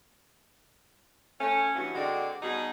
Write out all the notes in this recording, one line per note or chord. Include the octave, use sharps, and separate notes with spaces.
A3 C#4
G2 E3 C#4 F#4
D3 G#3 C4 F#4 D5
B2 G3 D#4 F#4 G#4